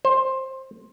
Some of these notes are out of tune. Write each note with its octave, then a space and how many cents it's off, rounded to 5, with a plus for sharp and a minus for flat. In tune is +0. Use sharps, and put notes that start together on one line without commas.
C5 +15